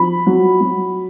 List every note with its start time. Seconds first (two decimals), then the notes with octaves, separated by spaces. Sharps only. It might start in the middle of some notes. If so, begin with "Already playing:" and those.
Already playing: F3 B5
0.27 F#3
0.61 F#3